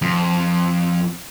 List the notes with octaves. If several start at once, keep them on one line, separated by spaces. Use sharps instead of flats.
F2